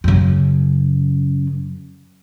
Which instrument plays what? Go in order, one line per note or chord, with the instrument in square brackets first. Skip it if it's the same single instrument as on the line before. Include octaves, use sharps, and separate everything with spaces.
[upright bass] F#2 C#3